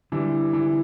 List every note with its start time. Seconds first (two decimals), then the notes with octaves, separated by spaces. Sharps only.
0.12 D3 E3 G3
0.53 E3